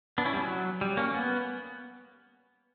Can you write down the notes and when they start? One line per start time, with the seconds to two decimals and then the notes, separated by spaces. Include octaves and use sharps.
0.18 B3 D4
0.25 C#4 E4
0.33 G3
0.41 F#3
0.81 G3
0.97 A#3 C#4
1.14 B3